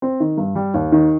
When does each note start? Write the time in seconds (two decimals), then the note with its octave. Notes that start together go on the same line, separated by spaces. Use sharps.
0.02 C4
0.20 D#3
0.38 G2
0.55 G3
0.74 D#2
0.92 D#3